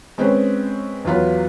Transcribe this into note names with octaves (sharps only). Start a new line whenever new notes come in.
G#3 C4 C#4 B4 C5
E2 F#3 F4 B4